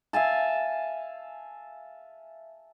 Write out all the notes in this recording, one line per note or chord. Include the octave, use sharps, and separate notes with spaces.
E5 F5 G#5 A5